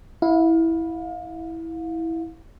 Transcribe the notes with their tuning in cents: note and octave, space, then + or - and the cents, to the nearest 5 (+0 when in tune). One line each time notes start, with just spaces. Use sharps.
E4 -10 F5 +30